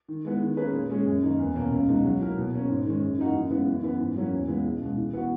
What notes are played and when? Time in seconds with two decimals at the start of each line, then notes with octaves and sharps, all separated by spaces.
0.08 D#3
0.25 G#3 B3 E4
0.41 D#3
0.57 A#3 C#4 G#4 B4
0.74 A#2
0.89 G#3 C#4 G#4
1.06 F#2
1.22 D#3 A#3 D#4
1.39 E2
1.55 B2 A#3 C#4
1.71 C#2
1.87 B2 G#3 D#4
2.04 F#3
2.20 A#3 E4 A#4
2.37 B2
2.53 A#3 C#4
2.69 G#2
2.85 D#3 G#3 C#4
3.02 F#2
3.18 E3 A#3 D#4 F#4
3.34 F#2
3.50 C#3 E3 G#3 B3
3.67 F#2
3.83 E3 B3
3.99 G#2
4.16 F#3 A#3 C#4 E4
4.32 E2
4.48 C#3 G#3 B3 E4
4.64 C#2
4.81 B2 G#3
4.97 E3
5.13 B3 F#4